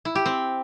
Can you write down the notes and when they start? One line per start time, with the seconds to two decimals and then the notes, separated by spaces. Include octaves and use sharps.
0.05 E4
0.15 G4
0.26 C4